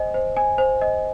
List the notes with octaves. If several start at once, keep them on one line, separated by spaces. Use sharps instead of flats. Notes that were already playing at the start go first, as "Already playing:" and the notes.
Already playing: C5 D#5 G#5
C5
G#5
C5
D#5